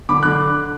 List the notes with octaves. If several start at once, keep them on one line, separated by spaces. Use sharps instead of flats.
D3 B5 D6
D3 F#6